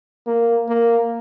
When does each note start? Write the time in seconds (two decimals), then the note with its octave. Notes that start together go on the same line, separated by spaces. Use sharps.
0.27 A#3
0.68 A#3